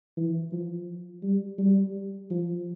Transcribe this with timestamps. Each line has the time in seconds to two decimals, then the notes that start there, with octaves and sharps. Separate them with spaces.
0.17 E3
0.52 F3
1.23 G3
1.58 G3
2.30 F3